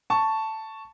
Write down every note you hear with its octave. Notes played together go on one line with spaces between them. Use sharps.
A5 C#6